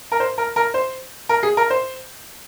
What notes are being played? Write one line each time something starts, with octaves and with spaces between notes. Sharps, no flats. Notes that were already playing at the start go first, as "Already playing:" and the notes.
A#4
C5
A#4
A#4
C5
A#4
G#4
A#4
C5